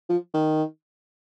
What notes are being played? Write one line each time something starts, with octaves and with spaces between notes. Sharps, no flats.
F3
D#3